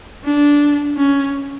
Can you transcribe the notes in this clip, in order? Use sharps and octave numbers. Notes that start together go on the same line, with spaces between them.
D4
C#4